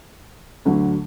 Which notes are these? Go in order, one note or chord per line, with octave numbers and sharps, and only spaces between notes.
D2 D3 F#3